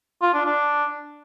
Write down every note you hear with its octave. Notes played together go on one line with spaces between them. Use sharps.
F4
D4
D4